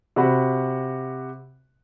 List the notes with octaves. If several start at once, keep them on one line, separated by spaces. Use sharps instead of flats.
C3 F#4 B5